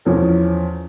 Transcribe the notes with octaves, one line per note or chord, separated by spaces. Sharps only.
E2 F3 C#4 A4